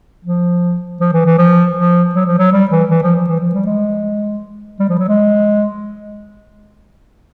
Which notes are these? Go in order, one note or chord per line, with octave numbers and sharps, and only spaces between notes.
F3
F3
E3
E3
F3
F3
F#3
F3
F#3
G3
E3
E3
F3
F3
E3
F3
G3
G#3
G3
F3
F#3
G#3